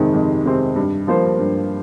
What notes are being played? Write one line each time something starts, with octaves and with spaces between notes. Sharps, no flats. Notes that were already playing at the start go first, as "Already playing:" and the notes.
Already playing: F2 C3 D#3 G#3 C4
F2
C3 D#3 G#3 C4
G2
F3 A#3 F4 C5
G2